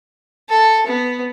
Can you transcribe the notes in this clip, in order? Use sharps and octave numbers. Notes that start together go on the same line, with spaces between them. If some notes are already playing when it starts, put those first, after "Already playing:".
A4
B3